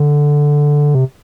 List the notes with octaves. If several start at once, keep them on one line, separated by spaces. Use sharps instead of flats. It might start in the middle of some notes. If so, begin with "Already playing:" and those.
Already playing: D3
C3